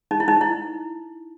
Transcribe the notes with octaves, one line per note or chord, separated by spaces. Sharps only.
D#4
E4
D#4
E4